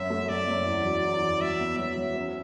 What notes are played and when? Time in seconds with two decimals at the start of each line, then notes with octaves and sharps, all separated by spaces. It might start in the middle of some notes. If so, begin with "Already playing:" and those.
Already playing: F#2 E5
0.10 A3
0.29 F#2 D5
0.48 F#2
0.66 E2
0.85 F#3
1.04 E2
1.22 F#3
1.41 F#3 E5
1.60 B3
1.78 F#3 E5
1.97 F#3
2.16 C#4